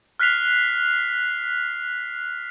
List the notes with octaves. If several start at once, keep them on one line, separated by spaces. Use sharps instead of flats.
F6 F#6 B6 C7 F7